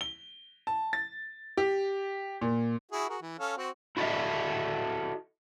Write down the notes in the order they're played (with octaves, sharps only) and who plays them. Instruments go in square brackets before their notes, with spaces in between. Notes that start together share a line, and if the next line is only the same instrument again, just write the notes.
[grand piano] G7
A5
A6
G4
A#2
[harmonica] E4 F#4 G#4
F#4 G#4 A#4
E3
C#4 A4 F5
C4 F#4
[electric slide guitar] E4 F#4 A4 C#5 D#5 E5